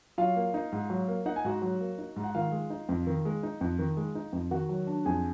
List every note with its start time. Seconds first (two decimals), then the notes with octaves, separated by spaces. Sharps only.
0.18 F#3 F4 F5
0.36 A#3
0.54 D#4
0.72 G#2
0.90 F#3
1.08 A#3
1.26 D#4 F#5
1.36 G#5
1.45 G#2 F#4 F#5
1.62 F#3
1.80 A#3
1.98 D#4
2.16 G#2
2.24 F#5
2.34 D#3 F4 F5
2.52 G#3
2.70 D#4
2.89 F2
3.07 D#3
3.25 G#3
3.43 D#4
3.61 F2
3.79 D#3
3.97 G#3
4.15 D#4
4.33 F2
4.51 D#3 F#4 F#5
4.69 F#3
4.87 D4
5.05 F2 G#4 G#5